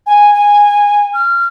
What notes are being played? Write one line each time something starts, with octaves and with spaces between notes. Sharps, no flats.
G#5
G#5
F6